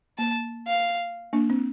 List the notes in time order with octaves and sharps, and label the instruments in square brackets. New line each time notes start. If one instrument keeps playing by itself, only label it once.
[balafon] A#3 [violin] A5
[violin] F5
[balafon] A#3 D4
C4